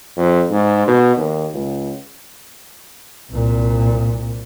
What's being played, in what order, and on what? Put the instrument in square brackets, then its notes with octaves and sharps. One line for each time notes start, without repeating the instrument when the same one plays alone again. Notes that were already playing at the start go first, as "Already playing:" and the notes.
[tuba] F2
G#2
B2
D#2
C#2
[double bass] C2 A#2